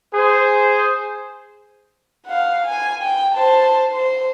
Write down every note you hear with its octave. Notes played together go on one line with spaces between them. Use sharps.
G#4 C5
F5 F#5
G#5
G5
C5 A5
C5